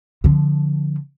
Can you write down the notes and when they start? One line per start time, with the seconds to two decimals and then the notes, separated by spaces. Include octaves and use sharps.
0.24 D3 F3